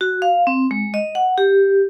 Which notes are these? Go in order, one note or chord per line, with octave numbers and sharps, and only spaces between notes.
F#4
F5
C4
G#3
D#5
F#5
G4